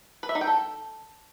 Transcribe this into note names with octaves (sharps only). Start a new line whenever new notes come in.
B4
E5
D#4
G5
A4